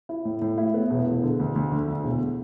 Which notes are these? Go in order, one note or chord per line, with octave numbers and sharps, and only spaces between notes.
E4
A2
A2
E4
B3
E1
E1
D3
D2
D2
D3
D2
E1